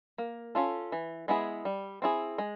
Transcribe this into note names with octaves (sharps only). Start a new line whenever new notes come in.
A#3
C#4 F4 A4
E3
G#3 B3 E4 G#4
G3
C4 E4 G#4
G#3